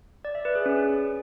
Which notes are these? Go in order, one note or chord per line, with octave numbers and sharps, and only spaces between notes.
D5
E5
B4
G#4
C#4